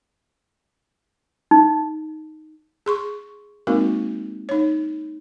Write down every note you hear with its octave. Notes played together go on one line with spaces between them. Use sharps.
D#4
G#4 C6 C#6
G#3 A#3 C4 D#4 F#4 A#4
D#4 C#5